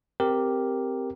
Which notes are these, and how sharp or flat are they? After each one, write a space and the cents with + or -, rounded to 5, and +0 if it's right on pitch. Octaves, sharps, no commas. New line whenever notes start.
C4 -5 G4 +0 A#4 +0